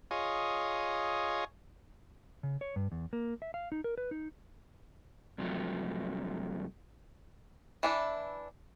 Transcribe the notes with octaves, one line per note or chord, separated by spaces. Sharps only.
F4 G#4 C#5 D#5
C#3
C#5
G2
E2
A#3
E5
F5
D#4
A#4
B4
D#4
G2 C3 F3 F#3 A3
E3 D4 E4